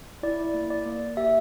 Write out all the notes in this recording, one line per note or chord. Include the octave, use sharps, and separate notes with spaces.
E4 D5
A#3
D5
A#3
G4 E5